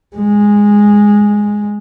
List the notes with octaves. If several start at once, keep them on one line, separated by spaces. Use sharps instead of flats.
G#3